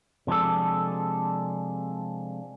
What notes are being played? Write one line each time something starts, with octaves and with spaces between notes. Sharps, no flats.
C3 F3 G#3 D4 A4